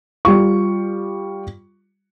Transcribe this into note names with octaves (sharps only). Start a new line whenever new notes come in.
G3 F4 C#6